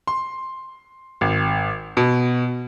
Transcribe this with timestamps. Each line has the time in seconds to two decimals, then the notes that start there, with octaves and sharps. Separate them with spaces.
0.07 C6
1.21 G#1
1.97 B2